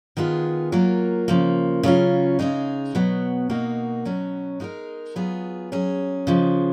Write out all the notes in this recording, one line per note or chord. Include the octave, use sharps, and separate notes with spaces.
D#3 G#3 B3 F4 G#4
F#3 A#3 F4 A#4
C#3 F3 A#3
C#3 F#3 C#4 F4
C#3 G#3 D#4 G#4
B2 F#3 B3
B2 A#3 D#4 F#4
B2 F#3 C#4
G#3 D#4 F#4 A#4
F#3 B3 F4 G#4
F#3 C#4 G#4
C#3 F3 G#3